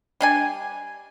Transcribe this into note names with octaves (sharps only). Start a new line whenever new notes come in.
G3 D4 G#5